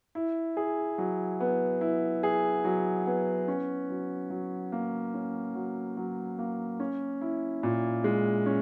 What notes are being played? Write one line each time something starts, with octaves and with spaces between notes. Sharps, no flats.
E4
G#4
F#3
B3
E4
G#4
F#3
B3
C#4
F#3
F#3
A#3
C#4
F#3
F#3
A#3
C#4
E4
A#2
G#3
C#4